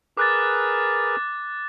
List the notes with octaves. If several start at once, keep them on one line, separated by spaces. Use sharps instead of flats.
G#4 A#4 B4 D6 F#6 A6